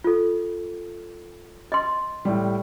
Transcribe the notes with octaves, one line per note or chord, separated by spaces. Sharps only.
F4 A4
D#5 C6
A2 G3